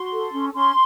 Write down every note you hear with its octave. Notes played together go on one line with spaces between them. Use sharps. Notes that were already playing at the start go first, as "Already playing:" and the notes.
Already playing: F#4 C6
A4
C#4
C#4 C6